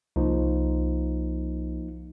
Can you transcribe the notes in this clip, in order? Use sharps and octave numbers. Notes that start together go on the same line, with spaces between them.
C2 F3 A#3 D#4